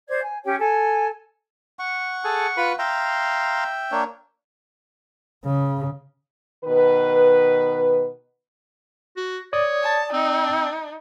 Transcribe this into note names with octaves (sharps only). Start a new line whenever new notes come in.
C5 D5 G#6
G#5
C#4 G4 C#5 G5
A4 G#5
F#5 C#6
G#4 A4
F4 B4 B5
E5 F5 G5 A#5 C6
A#3 D4 C#5
C#3
B2 D#3 B4
F#4
C#5 D5 D#6
A5
C4 D#4